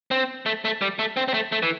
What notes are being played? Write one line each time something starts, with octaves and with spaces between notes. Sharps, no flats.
C4
A3
A3
G3
A3
C4
C4
A3
A3
E3